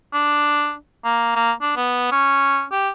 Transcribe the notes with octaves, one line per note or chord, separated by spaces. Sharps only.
D4
A#3
A#3
D4
B3
C#4
G4